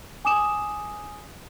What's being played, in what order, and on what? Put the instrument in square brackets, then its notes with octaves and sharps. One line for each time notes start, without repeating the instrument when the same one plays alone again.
[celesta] G#5 D6 D#6 E7